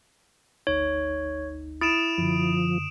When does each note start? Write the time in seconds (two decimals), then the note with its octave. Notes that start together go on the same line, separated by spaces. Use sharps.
0.67 G1 D2 D#4 C#5
1.81 E4 D#6 D7 E7
2.18 F#2 D3 F3